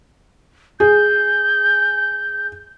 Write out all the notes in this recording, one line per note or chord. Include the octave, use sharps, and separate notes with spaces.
G#4 G6